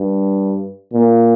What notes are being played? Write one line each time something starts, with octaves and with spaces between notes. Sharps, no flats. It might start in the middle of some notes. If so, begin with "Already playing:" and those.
Already playing: G2
A#2